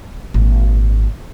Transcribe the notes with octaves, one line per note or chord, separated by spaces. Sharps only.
G#1 A#2